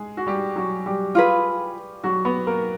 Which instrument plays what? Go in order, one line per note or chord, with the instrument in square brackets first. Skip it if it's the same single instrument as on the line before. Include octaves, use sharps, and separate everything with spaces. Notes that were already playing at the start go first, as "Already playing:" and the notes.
Already playing: [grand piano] G#3 G#4
F#4
G3 G4
F#3 F#4
G3 G4
[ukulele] F4 G#4 B4
[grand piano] F#3 F#4
B3 B4
A#3 A#4